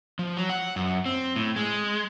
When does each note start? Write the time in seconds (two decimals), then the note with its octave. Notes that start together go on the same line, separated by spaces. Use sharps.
0.19 F3
0.37 F#3
0.50 F#5
0.76 F#2
1.06 C4
1.36 A2
1.56 G#3